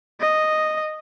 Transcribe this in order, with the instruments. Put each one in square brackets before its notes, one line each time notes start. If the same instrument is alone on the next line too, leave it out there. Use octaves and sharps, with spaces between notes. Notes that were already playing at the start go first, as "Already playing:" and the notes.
[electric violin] D#5